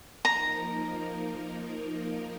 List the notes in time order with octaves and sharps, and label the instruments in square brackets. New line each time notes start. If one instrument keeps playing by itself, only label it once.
[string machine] F3 A#3 D#4 A#4 [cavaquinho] A#5